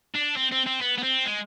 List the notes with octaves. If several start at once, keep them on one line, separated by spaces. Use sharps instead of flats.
D4
C4
C4
C4
B3
B3
C4
G#3